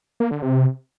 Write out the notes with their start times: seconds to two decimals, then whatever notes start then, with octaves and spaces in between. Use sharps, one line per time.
0.20 A#3
0.31 D3
0.42 C3